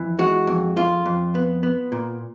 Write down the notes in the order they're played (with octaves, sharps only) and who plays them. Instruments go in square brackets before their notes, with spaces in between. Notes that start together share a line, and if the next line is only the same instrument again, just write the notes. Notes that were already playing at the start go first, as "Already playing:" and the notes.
Already playing: [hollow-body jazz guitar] F2 E3
G#3 F#4
F2
F2 F4
F2
B3
B3
A#2